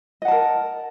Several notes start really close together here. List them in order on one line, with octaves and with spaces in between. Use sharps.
D#5 F#5 A5 A#4